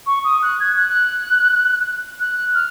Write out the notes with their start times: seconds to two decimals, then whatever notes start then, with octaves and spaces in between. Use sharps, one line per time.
0.07 C#6
0.24 D#6
0.43 F#6
0.60 G#6
0.77 F#6
2.20 F#6
2.54 F6